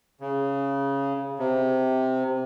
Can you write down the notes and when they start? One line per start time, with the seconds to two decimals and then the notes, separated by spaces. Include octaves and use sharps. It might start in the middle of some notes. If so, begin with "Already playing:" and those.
0.20 C#3
1.39 C3